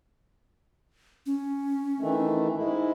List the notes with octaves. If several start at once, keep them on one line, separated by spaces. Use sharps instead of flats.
C#4
D#3 E3 A3
G#2 G#3 E4